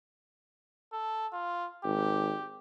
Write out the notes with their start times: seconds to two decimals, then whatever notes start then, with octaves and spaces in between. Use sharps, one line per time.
0.93 A4
1.33 F4
1.84 G#1 G4